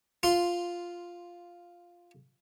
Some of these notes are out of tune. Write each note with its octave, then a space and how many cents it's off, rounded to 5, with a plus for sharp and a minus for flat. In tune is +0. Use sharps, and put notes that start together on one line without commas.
F4 +0 C6 -5